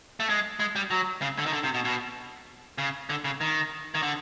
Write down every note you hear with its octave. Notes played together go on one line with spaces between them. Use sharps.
A3
G#3
G#3
G3
F#3
C#3
D3
D#3
D3
C3
B2
B2
C#3
D3
C#3
D#3
D#3
D3